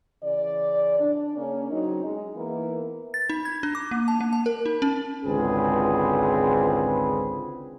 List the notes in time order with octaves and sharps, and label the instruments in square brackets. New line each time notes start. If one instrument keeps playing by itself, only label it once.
[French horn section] C#3 E3 D5
D4
C#3 A#3 C#4
F#3 C4 D#4
G#3
E3 A#3 B3 E4 A#4
[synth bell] A6
D#4
G#6
D4
D6
A#3
A5
A#3
A5
A#4
D#4
C#4
[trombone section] G#1 C#2 D3 C4 G#4 B4